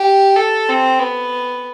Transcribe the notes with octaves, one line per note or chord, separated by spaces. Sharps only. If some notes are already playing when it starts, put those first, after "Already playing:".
Already playing: G4
A4
C4
B3